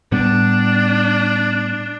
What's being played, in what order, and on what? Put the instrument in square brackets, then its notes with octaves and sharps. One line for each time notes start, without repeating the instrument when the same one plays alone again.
[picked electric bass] A2 G3 B3 [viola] D4